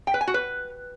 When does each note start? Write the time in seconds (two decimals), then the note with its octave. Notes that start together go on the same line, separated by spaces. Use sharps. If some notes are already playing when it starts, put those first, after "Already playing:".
0.07 G5
0.14 B4
0.21 G#5
0.27 F#4
0.34 B4